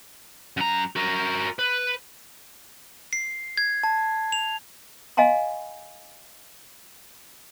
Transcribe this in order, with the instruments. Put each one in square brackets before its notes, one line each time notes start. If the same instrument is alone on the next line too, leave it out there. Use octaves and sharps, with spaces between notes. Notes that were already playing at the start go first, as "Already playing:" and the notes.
[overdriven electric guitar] F#2 A#5
F#4 A#4
B4
[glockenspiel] C7
G#6
A5
F7
[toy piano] D#5 F5 G#5 A#5 C6